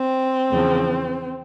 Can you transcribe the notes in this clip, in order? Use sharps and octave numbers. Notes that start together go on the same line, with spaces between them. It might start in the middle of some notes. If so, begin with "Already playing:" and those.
Already playing: C4
E2 C#3 F3